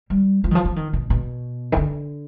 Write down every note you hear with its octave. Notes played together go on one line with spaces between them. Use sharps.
G3
F3
D#3
F3
F3
D#3
B2
B2
D#3
D3